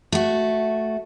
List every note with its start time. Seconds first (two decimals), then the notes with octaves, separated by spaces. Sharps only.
0.12 A3 F#4